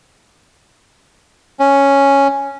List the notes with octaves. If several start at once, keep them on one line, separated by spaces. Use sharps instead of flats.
C#4